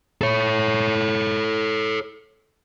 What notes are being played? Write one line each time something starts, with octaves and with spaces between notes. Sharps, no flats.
A4 C#5